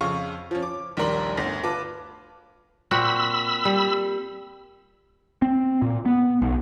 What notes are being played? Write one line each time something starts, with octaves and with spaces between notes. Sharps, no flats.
F2 C#3 F5 C#6
F3 C#4
D6
A#1 D#2 G3 A#4 C6 F#7
G1 D2 A#6
F4 B4 A5 D6
A#2 C4 F#4 B5 E6
G3
C4
A#2
B3
B1